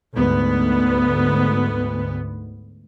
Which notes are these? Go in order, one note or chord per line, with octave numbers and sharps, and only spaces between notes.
D2 G#2 B3